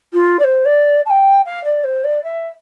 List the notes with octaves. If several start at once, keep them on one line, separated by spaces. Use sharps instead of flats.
F4
D5
C5
D5
A5
G5
F5
D5
C5
D5
E5